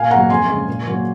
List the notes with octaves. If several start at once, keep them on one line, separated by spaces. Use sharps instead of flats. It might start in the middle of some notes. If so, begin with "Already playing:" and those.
Already playing: A#2 F5 G#5
F#3 A#3 F#5 A#5
F2 G#5 C6
C#3 G#3
A#2
F#3 A#3